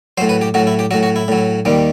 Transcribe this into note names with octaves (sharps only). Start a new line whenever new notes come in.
A2 F#3 C5
B4
G4
A2 F#3 F#4
E4
G4
A2 F#3 F#4
F#4
E4
A2 F#3
D#2 D#3 G3